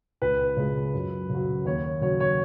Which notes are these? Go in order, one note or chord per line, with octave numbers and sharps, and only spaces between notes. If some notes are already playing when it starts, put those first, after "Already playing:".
C#2 B4
C#3 G#3
F#2
C#3
F#3
D#2 C#5
C#3 F#3 C#5
C#5